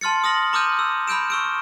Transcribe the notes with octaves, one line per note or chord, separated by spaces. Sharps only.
A5 C6 F6 A6 C#7
D#6 F6 A#6 F#7
A#5 D6 D#6 F6 G6 D#7
E6
B5 F6 G6 D7 E7
C#6 E6 D7